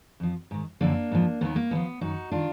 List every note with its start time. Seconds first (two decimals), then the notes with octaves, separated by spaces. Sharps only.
0.20 F2 F3
0.51 G#2 D#3
0.81 F#2 D3 F3 A#3 D4
1.11 G#2 F3
1.41 D#2 D#3 B3
1.56 A#3
1.71 D#2 D3 B3
1.75 F3
2.01 F#2 D#3 D#4 F#4
2.32 D#3 D4 F4